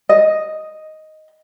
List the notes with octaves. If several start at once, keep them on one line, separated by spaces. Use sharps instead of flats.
D#5